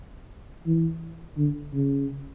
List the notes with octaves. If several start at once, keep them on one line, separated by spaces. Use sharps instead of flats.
E3
D3
C#3